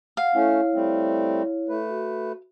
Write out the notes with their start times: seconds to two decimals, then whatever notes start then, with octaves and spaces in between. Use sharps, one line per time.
0.17 F5 F#5
0.35 A3 C#4 E4 C#5
0.74 G3 A3 C4
1.69 A3 B4
1.89 F#4